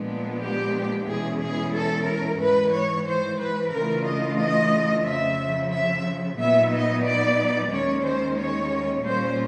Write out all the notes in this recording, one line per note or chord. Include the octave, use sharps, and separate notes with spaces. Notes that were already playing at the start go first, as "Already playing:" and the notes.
Already playing: A#2 F3 G#3 B3 D4
G4
E2 B2 G#3 C#4 E4 G#4
G#4
A4
A#4
G#2 E3 G#3 B4
C#5
C5
B4
C#3 E3 A3 D4 F4 A#4
D#5
D#5
F2 C#3 F3 E5
E5
A#2 F#3 B3 D#4 E5
D#5
D5
D#2 D#3 G#3 C#4 C#5
C5
C#5
A#2 G3 A#3 C#4 F4 C5